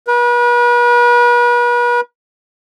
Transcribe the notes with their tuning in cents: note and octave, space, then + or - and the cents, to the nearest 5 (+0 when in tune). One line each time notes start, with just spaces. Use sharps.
B4 -40